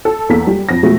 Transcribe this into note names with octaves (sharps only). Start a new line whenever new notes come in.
A4
E2 A#3 A4 B6
G3
F2 A#6
B2 F3 G#3 A3